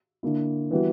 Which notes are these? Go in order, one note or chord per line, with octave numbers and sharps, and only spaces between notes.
D3 A#3 E4
E3 G3 B3 F#4